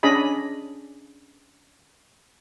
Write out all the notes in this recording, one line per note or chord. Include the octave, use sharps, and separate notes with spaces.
C#4 D4 G#4 D#5 B5